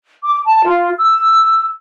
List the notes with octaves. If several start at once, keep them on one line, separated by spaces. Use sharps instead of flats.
D6
A5
F4
E6